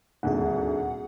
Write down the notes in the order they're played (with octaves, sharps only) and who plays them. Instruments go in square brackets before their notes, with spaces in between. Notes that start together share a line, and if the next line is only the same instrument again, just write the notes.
[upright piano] D#1 G#1 D2 [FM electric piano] G#4 F#5